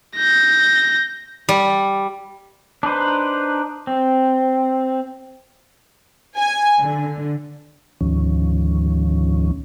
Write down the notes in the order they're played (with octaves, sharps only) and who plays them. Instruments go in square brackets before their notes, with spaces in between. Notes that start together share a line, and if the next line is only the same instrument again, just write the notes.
[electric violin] G6 A#6
[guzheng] G3
[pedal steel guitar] D4 D#4 B4 C5
C4
[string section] G#5
D3
[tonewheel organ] D2 G#2 D#3 F3 C#4